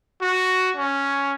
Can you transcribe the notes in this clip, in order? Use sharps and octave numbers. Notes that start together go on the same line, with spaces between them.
F#4
C#4